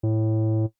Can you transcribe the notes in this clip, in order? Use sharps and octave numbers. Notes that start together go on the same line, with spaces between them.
A2